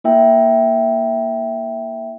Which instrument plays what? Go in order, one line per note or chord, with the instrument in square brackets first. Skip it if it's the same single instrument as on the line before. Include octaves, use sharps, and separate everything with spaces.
[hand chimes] A#3 E4 E5 G5